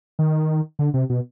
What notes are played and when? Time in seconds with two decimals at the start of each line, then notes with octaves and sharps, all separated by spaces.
0.19 D#3
0.79 D3
0.94 C3
1.10 B2